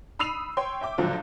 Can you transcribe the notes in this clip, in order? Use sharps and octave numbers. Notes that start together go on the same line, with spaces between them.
B5 D#6 E6 C7 D#7 F7
C#5 G5 C6
E5 G5 D6
C#2 A#2 D3 F3 F#3